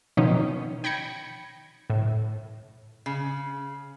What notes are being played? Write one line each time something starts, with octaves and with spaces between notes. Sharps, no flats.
B2 D#3 F3 C#4 D#4
G5 B5 G#6 A#6 C#7
A2
C#3